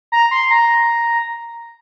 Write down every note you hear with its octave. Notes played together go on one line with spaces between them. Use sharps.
A#5
C6
A#5